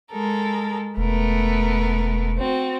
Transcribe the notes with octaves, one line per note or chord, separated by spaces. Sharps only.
G#3 A4 A#4
E1 A3 B3 A#4
C4 F#4